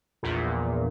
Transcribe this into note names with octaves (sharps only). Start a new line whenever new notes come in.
A#1 E2 A#2